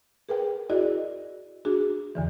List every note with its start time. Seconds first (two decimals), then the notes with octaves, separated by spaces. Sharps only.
0.29 G#4 A#4 B4 G5
0.70 E4 F#4 G#4 D5 D#5
1.65 D4 F#4 G#4
2.15 E2 D3 E3